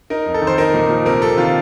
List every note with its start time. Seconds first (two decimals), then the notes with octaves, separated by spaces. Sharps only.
0.10 D#4 A#4
0.26 F2
0.34 A4
0.42 D#3
0.47 C5
0.58 D#4 A#4
0.74 A#2
0.90 F3
1.05 C3 A#4
1.22 C3 A4
1.38 D#3 F4